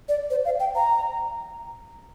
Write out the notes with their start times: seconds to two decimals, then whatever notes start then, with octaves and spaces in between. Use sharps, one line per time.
0.09 D5
0.31 C5
0.45 F5
0.60 G5
0.75 A#5